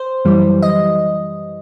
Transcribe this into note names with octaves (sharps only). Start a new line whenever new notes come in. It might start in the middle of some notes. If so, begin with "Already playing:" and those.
Already playing: C5
F#2 E3 G3
D#5